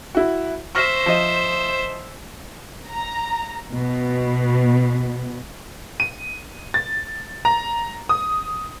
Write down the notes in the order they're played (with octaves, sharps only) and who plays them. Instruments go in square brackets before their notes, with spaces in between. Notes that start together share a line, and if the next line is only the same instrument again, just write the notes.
[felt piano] E4 F#4
[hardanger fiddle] C5 E5 [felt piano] C#6 F6 A#6
[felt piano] F3 D#5
[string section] A#5
B2
[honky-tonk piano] D#7
A6
A#5
D#6